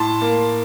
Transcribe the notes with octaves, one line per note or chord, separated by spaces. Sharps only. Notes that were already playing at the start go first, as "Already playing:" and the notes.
Already playing: A2 A5 C6
A#3